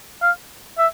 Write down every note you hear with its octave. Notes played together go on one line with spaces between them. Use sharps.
F5
E5